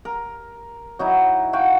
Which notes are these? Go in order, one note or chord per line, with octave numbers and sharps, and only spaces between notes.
A#4
F#3 D#4 E4
F#4 F5 G5